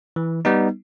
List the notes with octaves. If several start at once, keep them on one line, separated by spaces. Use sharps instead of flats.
E3
G3 B3 D#4